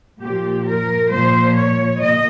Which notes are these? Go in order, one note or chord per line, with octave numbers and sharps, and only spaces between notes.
A#2 F3 G4
A#4
A#2 F3 C5
C#5
A#2 D#5